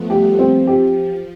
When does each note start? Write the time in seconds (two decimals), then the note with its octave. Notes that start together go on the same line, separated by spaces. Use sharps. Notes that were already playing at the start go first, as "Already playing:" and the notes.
Already playing: F3 A3 B3
0.10 G3 G4
0.39 F3 C4
0.67 G4